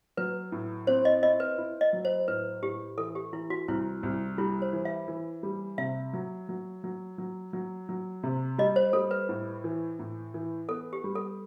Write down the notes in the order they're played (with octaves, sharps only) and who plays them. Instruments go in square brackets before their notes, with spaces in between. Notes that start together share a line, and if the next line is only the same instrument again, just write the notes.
[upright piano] F#3 [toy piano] B4
[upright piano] A2
[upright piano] C4 [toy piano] C5
[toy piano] D#5
[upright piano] E4 [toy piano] D#5
[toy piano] B4
[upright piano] E4
[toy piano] D#5
[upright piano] F#3
[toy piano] C5
[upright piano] A2 [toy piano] B4
[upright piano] A2 [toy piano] G4
[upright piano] E3 [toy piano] A4
[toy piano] G4
[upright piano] E3 [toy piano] E4
[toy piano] F#4
[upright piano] C2 [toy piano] E4
[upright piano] C2
[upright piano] G3 [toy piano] E4
[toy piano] C5
[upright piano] E3
[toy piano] E5
[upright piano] E3
G3
[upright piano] C3 [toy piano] E5
[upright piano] F#3
F#3
F#3
F#3
F#3
F#3
C3
[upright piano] G3 [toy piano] D#5
[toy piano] C5
[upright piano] G3 [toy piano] A4
[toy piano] B4
[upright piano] A2
E3
A2
E3
[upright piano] B3 [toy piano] A4
[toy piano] G4
[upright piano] G3
[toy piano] A4